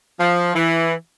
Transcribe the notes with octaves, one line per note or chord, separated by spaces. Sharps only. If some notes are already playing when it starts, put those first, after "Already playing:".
F3
E3